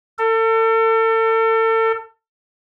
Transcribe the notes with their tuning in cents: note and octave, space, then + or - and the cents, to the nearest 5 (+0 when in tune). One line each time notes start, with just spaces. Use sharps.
A4 +35